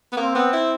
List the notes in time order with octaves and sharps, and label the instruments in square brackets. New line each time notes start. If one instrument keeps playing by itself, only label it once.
[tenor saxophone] B3
[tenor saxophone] A#3 [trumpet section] C4
[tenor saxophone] B3
E4